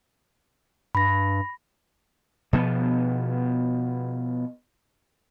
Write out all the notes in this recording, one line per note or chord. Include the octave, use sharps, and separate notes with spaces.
G2 B5 A#6
B2 F3 B3